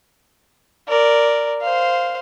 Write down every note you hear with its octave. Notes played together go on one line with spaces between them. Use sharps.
A#4 D5
C5 F5